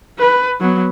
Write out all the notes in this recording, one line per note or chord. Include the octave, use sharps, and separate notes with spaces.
B4
F#3 B3